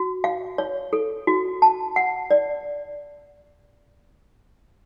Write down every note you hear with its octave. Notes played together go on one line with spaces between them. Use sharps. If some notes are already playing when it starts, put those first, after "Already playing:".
Already playing: F#4
F5
C#5
A4
F#4
A5
F#5
D5